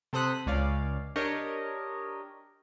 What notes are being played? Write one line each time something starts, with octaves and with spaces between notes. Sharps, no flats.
C3 A4 C5 D#6 F#6 B6
C#2 C#4 D5 F5
D4 G4 A#4 C#5 D#5